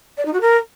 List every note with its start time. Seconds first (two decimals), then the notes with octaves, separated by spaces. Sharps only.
0.17 D5
0.25 D#4
0.33 F#4
0.41 A#4